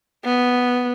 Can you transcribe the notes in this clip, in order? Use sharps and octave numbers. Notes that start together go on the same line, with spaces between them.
B3